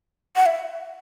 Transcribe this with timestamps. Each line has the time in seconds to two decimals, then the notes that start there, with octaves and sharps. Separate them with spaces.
0.36 F#5
0.46 E5